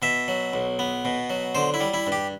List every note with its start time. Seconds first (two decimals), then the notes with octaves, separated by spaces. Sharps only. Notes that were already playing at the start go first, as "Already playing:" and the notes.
0.02 B2 E5
0.28 F#3
0.54 B1
0.79 B3
1.05 B2
1.30 F#3
1.55 D3 C5
1.74 E4
1.80 G3
1.94 E4
2.07 G2
2.12 G4